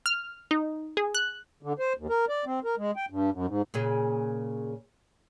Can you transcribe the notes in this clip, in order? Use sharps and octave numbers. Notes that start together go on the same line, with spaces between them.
F6
D#4
G#4
F#6
D3
C5
D#2
A#4
D5
C4
A#4
G#3
G5
G2
F#2
G#2
A#2 C#3 G#4